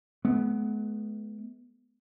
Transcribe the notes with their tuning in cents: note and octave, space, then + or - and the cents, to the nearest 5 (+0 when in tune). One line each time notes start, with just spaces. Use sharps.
G#3 +45 B3 +0